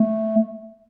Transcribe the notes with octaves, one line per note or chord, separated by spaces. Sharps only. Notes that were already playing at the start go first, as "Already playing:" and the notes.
Already playing: A3